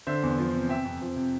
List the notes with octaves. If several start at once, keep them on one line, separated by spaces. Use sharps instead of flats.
D3 C5 E5
E2
F3
C3
C3 E5 G5
F2
F3
C3